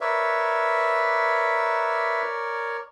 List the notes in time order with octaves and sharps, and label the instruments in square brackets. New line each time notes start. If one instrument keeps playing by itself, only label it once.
[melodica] A#4 C#5 D5 [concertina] B4 E5